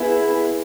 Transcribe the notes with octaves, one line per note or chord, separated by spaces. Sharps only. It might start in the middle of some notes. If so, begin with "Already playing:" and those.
Already playing: B3 E4 G#4